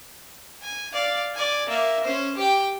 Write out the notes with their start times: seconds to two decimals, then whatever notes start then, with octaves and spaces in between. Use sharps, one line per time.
0.62 G#5
0.93 D5 F5
1.35 D5 G#5
1.69 A#3 E5
2.05 C#4 C5
2.37 G4 G5